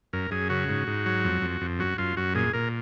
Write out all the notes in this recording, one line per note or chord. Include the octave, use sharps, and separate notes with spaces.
F#2 A#4
F#2 G#4
C#3 F#4
G#2
G#2
F#3
F2
F2
F2
F#2 F#4
F#2 F4
F#2 F#4
A#2 G#4
A#2 A#4